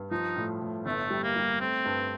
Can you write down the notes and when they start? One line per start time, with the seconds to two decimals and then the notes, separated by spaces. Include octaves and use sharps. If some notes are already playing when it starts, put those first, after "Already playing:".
Already playing: G2
0.11 F3 D#4
0.36 A2
0.61 A2
0.85 G1 A3
1.11 G3
1.23 A#3
1.36 G3
1.60 A3 C4
1.85 G2